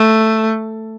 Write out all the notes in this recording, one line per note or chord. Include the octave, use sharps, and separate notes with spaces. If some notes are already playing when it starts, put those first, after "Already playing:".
Already playing: A3